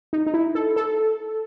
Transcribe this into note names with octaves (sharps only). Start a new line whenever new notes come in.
D#4
D#4
E4
A4
A4